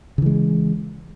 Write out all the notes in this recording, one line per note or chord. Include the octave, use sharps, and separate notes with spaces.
C#3 E3 G#3